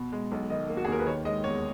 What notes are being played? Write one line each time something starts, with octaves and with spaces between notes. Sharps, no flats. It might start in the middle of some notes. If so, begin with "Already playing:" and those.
Already playing: B2
G#3
B1
D#3 D#5
A#3
F#4
G#4
D#2 A#4
B4
D#3 C#5
G#3 D#5
E2 C#5